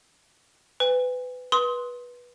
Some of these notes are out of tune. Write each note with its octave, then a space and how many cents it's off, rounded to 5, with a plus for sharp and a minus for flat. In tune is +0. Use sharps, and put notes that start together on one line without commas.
B4 +25 G#5 -45
B4 -15 C6 +5 D#6 +30